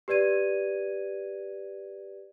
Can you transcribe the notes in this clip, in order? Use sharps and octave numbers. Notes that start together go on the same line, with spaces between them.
G4 B4 D5 G#6 D#7